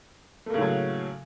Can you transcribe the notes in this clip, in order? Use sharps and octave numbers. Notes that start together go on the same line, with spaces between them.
A2 C#3 F#3 A3 A#3